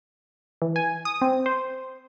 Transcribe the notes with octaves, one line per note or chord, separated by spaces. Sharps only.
E3
G#5
D#6
C4
C5